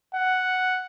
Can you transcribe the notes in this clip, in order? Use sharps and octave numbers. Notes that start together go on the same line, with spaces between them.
F#5